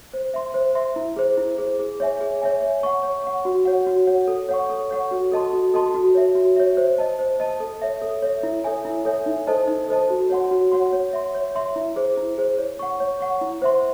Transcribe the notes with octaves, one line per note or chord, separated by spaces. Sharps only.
C5
E5 C6
C5
E5 C6
E4
G#4 C5
E4
G#4 C5
G#4
C#5 E5 G#5
G#4
C#5 E5 G#5
C#5
F#5 C#6
C#5
F#5 C#6
F#4
C#5 F#5
F#4
C#5 F#5
A4
C#5 F#5 C#6
A4
C#5 F#5 C#6
F#4
A4 D#5 A5 C6
F#4
A4 D#5 A5 C6
F#4
C#5 E5
F#4
C#5 E5
C5
D#5 A5
C5
D#5 A5
A4
C#5 E5
A4
C#5 E5
E4
A4 C#5 E5 G#5
E4
A4 C#5 E5 G#5
D#4
A4 C5 D#5 A5
D#4
A4 C5 D#5 A5
F#4
C#5 F#5 C6
F#4
C#5 F#5 C6
C#5
E5 C6
C#5
E5 C6
E4
G#4 C5
E4
G#4 C5
C#5
F#5 C#6
C#5
F#5 C#6
E4
C5 E5 C6